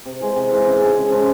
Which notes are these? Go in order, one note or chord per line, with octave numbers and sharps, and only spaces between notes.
C3
E3 G#3
C3
E3 G#3
C#3
F3 G#3 C#4
C#3
F3 G#3 C#4